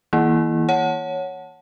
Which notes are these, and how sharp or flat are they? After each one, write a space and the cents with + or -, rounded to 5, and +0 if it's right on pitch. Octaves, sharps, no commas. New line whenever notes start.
E3 -30 A#3 +20 E4 +0
C#5 +0 F#5 +0 A5 +0